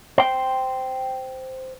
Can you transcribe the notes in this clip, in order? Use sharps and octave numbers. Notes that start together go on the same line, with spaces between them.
C5 G5